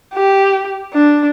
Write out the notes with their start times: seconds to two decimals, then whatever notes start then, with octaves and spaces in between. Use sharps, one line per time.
0.14 G4
0.93 D4